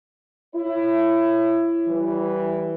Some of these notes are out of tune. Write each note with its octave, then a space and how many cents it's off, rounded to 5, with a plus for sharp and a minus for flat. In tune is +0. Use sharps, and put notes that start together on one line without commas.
E4 +20 C#5 -15
E3 +0 G3 -20